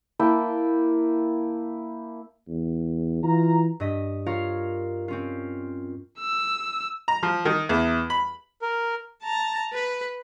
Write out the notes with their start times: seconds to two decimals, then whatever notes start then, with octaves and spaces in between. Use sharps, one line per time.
0.19 A#3 E4 G5 A5
2.48 E2
3.23 E3 F4 A#5
3.80 G2 D#5 B6
4.26 F4 A#4 C#5 F5
5.08 C4 C#4 F4
6.19 E6
7.08 A#5
7.23 F3
7.45 D#3
7.69 E2
8.10 B5
8.62 A#4
9.23 A5 A#5
9.73 B4